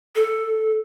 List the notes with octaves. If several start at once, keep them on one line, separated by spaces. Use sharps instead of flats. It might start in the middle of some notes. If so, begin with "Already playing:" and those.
A4